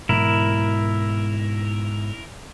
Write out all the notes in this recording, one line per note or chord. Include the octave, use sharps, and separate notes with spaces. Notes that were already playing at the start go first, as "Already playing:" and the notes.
G#2 B2 E3 E4 A#4